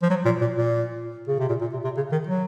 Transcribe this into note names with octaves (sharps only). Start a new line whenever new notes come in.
F3
F#3
A#2
A#2
A#2
C#3
C3
A#2
A#2
C3
C3
C#3
D#3
F#3